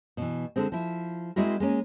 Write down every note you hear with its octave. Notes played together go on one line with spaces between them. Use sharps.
B2 E3
D3 G#3 C4
F3 E4
G#3 C4 E4 F#4 A#4
G#3 A#3 C#4